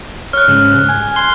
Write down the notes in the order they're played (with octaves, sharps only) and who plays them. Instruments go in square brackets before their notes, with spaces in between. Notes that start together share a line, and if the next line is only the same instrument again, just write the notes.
[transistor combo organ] C#5 [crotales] F6 F#6
[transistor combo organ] G#2 C#3
G#5
[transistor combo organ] C6 [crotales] G7